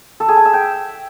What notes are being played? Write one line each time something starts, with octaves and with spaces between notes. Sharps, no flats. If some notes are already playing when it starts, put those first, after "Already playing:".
A4
G#4
G#5
E5
G5